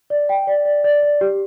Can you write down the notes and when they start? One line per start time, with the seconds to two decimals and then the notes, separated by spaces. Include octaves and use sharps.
0.10 D5
0.29 G5
0.47 D5
0.65 D5
0.84 D5
1.03 D5
1.21 G4